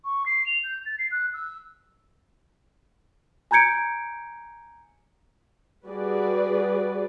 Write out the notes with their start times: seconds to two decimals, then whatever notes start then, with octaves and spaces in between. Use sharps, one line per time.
0.05 C#6
0.26 C7
0.46 F7
0.64 G6
0.85 A6
0.98 C7
1.11 F#6
1.33 E6
3.51 G#5 A#5 G6 G#6 C#7 D7
5.85 G3 F#4 G#4 B4 D5